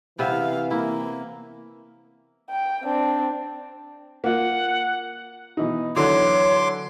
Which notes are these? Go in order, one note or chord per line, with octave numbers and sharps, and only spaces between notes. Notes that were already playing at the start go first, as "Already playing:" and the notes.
C3 E3 B3 E5 F5
A#3 E4
G5
C4 D4
A#3 F4 F#5
B2 E3 D#4
D3 E3 F#3 C#5 C6 D6